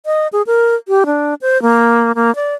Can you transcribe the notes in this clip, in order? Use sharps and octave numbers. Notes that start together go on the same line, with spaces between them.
D#5
G#4
A#4
G4
D4
C5
A#3
A#3
D5